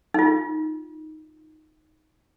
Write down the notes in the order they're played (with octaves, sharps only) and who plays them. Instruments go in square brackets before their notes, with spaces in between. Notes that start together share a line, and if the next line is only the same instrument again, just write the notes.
[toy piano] D#4 F4